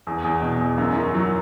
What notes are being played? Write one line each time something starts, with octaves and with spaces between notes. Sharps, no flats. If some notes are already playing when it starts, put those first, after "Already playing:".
E2
E2
B2
E2
F#2
D#3
F#3